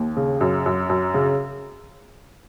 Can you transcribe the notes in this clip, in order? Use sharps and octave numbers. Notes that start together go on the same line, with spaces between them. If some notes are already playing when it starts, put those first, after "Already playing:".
Already playing: D#2
C#3
F#2
F#2
F#2
C#3